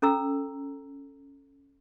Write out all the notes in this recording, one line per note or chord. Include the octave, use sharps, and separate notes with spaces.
C#4 A4 A#5 E6